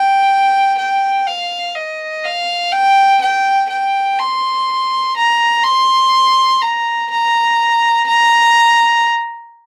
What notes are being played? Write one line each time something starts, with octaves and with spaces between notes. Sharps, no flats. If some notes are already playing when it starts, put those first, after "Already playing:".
Already playing: G5
G5
F5
D#5
F5
G5
G5
G5
C6
A#5
C6
A#5
A#5
A#5